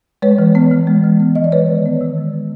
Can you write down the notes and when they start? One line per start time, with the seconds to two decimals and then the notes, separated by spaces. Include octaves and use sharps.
0.22 G#3 B4 C#5
0.39 E3
0.55 B3
0.71 E3
0.87 G#3
1.04 E3
1.20 B3
1.35 E3 D#5
1.44 D5
1.52 G#3 B4 C#5
1.69 D#3
1.85 B3
2.01 D#3
2.18 G#3
2.34 D#3